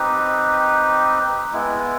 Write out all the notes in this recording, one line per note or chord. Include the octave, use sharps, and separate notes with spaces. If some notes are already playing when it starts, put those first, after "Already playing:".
Already playing: C4 D#4 G4 B4
G#3 B3 E4